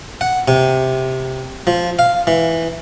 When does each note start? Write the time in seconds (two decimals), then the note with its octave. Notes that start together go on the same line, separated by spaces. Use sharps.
0.21 F#5
0.48 C3
1.67 F3
1.99 F5
2.27 E3